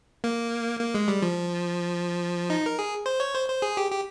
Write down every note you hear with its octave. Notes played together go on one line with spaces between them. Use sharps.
A#3
A#3
G#3
G3
F3
D#4
A#4
G#4
C5
C#5
C5
C5
G#4
G4
G4